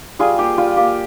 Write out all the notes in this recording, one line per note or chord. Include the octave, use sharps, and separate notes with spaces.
G3 F4 G#4
A#3 F4 G4
G3 F4
A#3 F4 G4